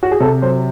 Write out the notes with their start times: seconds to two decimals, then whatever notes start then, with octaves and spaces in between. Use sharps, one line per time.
0.03 F#4
0.11 G#4
0.20 C3 A4
0.42 F#3 C5